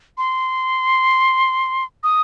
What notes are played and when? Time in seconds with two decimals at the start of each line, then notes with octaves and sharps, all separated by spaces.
0.18 C6
2.04 D#6